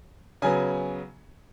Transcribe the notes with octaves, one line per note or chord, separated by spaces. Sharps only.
C#3 F#3 B3 G#5